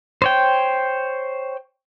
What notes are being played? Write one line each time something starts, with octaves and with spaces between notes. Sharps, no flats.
C5 C#5 G5